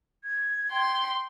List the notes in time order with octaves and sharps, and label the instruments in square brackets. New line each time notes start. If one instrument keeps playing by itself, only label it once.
[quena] G#6
[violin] G5 C6